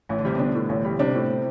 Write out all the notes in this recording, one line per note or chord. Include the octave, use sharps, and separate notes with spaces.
A1 E3
D3
C3 G3
B2 D3 D4
A2
A1
G3
C3 D4
A2